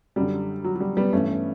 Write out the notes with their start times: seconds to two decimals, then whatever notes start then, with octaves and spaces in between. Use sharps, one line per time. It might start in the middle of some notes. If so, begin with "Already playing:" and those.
0.16 F#2 D3 G3
0.64 F#3
0.75 F#3
0.80 G3
0.97 G3 B3
1.13 G2 E3 A3 C#4